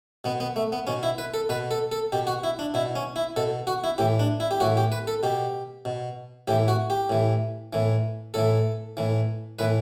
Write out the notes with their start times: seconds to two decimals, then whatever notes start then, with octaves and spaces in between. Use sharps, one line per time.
0.24 B2 B3
0.40 B3
0.56 A3
0.72 B3
0.87 B2 C#4
1.03 E4
1.18 B4
1.34 A4
1.49 B2 B4
1.71 A4
1.92 A4
2.12 B2 G4
2.27 F#4
2.44 E4
2.59 D4
2.74 B2 E4
2.96 C#4
3.16 E4
3.36 B2 A4
3.67 F#4
3.84 E4
3.98 A2 E3 G4
4.19 D4
4.40 E4
4.51 G4
4.60 A2 E3 F#4
4.77 G4
4.92 B4
5.07 A4
5.23 B2 G4
5.85 B2
6.48 A2 G4
6.51 E3
6.68 F#4
6.90 G4
7.09 A2 E3
7.73 A2 E3
8.34 A2 E3 A4
8.97 A2 E3
9.59 A2 E3 B4